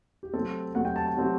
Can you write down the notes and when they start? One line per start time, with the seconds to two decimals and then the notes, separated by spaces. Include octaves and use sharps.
0.23 G4
0.33 C3 F#3 A3 C4 A4
0.75 C3 F#3 A3 C4 F#5
0.85 G5
0.96 A5
1.06 A5
1.17 C3 F#3 A3 C4